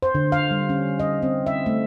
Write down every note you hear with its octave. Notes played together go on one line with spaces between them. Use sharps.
C5
D3
F5
G3
C#4
D#5
C4
E5
A3